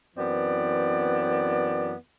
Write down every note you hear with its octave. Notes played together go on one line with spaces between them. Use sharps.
F#2 E3 B3 C4 D5